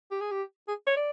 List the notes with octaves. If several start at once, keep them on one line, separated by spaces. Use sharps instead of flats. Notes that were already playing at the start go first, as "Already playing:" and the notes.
G4
G#4
G4
G#4
C#5
D5